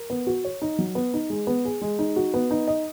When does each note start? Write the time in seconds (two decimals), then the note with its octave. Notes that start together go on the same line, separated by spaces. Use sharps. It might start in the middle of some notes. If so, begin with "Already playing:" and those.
Already playing: A#4
0.10 B3
0.27 F#4
0.44 C#5
0.62 D#4
0.79 F#3
0.95 B3
1.14 D#4
1.30 G#3
1.47 B3
1.65 G#4
1.81 G#3
1.99 D#4
2.16 F#4
2.34 B3
2.51 D#4
2.68 D#5